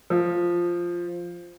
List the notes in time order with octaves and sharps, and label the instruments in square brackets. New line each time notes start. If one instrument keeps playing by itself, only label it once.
[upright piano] F3